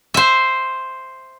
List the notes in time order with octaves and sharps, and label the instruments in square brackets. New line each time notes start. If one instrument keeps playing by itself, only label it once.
[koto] C5 E5